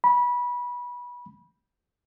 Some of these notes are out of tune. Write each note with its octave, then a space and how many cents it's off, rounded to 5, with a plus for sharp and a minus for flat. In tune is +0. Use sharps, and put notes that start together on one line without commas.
B5 -20